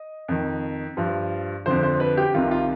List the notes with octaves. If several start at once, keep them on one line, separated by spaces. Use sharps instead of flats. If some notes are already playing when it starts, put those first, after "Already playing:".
Already playing: D#5
F2 D#3
G2 F3
F2 D3 F3 C5
C5
B4
G4
C2 C3 D#3 F4
F4